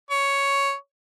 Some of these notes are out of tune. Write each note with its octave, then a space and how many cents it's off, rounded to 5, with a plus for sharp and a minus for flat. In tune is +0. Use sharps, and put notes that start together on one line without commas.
C#5 +5